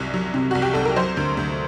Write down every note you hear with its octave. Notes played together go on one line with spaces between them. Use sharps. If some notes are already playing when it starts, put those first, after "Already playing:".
Already playing: C2 F#3
F#3
C3
C2 F#4
G4
C2 A4
A#4
F#3 C5
D2
D2